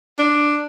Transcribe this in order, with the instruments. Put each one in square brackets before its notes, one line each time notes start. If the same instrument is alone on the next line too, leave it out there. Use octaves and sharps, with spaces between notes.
[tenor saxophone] D4